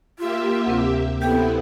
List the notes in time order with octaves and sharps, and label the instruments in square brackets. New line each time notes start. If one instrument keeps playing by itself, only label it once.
[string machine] A#3 G4 E5 [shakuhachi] F4
[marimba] D2 C3 C4
[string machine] B3 C4 E4 [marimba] G4 A4 [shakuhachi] G5